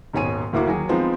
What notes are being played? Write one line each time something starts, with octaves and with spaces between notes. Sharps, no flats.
D#1 G#2 B2 C#5 G#5 D#7
D2 A2 A#3 E4 F#4 D6
D#2 F#3 G#4
F3 G#3 B3 C4 D#4